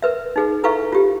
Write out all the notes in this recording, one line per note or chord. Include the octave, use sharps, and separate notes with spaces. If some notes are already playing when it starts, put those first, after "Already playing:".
A#4 B4 E5
D#4 G#4 B4
E4 A4 B4 E5 F5 C#6
F4 G4